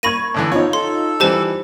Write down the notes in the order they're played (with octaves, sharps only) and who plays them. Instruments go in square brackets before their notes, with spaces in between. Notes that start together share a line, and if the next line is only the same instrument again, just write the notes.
[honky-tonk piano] A#3 C#6 G#6 [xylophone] B5 A#6 D#7
[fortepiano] A2 D3 E3
[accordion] F3 B3 [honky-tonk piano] D#4 F4 [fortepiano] C#5
[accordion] A4 [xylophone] C6
[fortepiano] E3 G3 [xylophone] G4 C5 A5